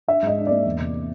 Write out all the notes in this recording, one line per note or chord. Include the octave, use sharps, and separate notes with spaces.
D4 E5
G#2 D#5
D4
A#3 D5
E2
C3